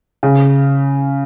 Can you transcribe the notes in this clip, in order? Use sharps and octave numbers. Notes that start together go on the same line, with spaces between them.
C#3